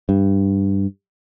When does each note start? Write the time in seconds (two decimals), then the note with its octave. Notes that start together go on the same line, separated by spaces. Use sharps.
0.09 G2